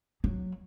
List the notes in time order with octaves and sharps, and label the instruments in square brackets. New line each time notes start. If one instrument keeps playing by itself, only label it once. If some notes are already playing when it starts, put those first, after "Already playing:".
[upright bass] F#3